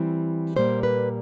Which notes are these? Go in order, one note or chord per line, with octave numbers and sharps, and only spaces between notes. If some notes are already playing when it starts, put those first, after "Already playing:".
Already playing: E3 G3 C4
A#2 G3 A#3 C5
B4